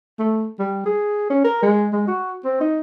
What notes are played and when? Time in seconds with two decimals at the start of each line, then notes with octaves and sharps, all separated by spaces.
0.19 A3
0.59 G3
0.85 G#4
1.30 C#4
1.44 A#4
1.62 G#3
1.92 G#3
2.07 F#4
2.44 C4
2.60 D#4